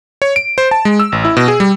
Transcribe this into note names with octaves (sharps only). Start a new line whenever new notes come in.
C#5
D7
C5
A5
G#3
E6
A1
E4
B2
G#4
G3